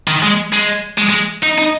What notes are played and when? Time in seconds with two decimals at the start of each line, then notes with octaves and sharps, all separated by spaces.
0.08 D#3
0.23 G#3
0.53 G#3
0.98 G#3
1.09 G#3
1.43 D#4
1.58 D#4